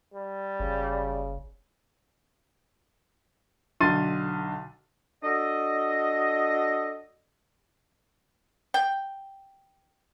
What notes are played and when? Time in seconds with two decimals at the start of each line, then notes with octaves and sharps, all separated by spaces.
0.14 G3
0.60 F#1 C#3
3.81 B1 D3 C6 A6 D#7
5.23 D4 F#4 A4 D#5
8.74 G5